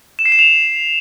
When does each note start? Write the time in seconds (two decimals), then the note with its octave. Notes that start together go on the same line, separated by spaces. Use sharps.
0.19 E7
0.26 C7
0.32 E7
0.39 F7